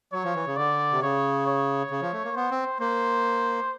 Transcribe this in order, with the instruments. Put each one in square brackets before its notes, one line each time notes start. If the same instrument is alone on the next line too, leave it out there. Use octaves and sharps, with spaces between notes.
[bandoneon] F#3 [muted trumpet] C#5
[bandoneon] F3
E3
C#3
[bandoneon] D3 [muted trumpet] D5
[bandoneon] C3
[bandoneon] C#3 [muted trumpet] C#5
[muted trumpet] C#5
[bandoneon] C#3
F3
A3
A#3
[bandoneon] B3 [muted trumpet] C5
[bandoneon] C4
[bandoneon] A#3 [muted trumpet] C5